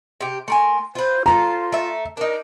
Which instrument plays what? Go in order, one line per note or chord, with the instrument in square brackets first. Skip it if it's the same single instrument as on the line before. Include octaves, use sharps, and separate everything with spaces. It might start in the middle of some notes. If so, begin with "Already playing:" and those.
[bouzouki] C3 G4
[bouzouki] A3 A#4 G#5 [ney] C6
[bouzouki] F4 B4 [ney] C5
[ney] F4 [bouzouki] A4 A#4 C5 [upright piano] A#5
[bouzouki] A3 E5
[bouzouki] D4 D#4 [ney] A#4